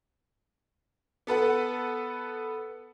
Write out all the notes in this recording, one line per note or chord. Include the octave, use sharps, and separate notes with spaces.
B3 A4 B4 F#5